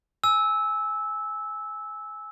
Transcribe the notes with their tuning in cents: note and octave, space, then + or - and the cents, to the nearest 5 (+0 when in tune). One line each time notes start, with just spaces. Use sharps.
G#5 +5 E6 -15